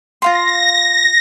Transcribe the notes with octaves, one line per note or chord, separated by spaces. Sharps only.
F4 F5 C6 A#6